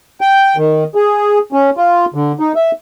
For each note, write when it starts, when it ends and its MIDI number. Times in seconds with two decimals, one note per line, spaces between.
0.21 0.56 79
0.57 0.84 51
0.95 1.38 68
1.53 1.70 61
1.77 2.05 65
2.14 2.32 50
2.39 2.53 63
2.56 2.71 76